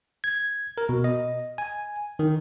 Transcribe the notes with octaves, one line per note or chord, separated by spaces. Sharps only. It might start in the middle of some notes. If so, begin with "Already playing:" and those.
G#6
A#4
B2
D#5
G#5
D#3